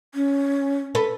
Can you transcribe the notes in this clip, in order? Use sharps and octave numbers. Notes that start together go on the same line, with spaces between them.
C#4
A4 B4